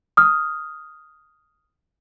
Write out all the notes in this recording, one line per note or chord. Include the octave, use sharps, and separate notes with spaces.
D#6 F6